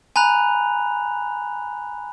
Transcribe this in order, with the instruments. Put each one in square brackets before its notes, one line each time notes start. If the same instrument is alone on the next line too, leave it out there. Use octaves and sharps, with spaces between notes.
[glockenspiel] G#5 A#5 B5 F#6 F7